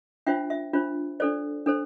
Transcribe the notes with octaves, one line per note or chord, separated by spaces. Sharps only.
D4 F4 C5 E5 G5
E5
D4 F4 C5
D4 A4 C5 D5
D4 A4 C5